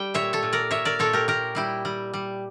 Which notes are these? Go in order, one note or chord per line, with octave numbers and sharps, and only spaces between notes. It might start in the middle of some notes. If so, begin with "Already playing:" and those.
Already playing: G3 G4 G5
A#2 C#5 E5
A4 C#5
A#2
A#4 D5
A#2 C#5 E5
A#4 D5
A#2 A4 C#5
G4 A#4
A#2 G4 A#4
G3 E4 G4
G3
G3